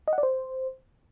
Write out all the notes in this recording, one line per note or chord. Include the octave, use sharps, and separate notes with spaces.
D#5
F#5
D5
C5